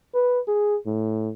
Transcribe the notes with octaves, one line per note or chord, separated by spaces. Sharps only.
B4
G#4
A2